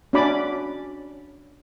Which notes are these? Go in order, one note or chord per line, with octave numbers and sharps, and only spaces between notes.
C#4 D4 F#4 D5 B5 D6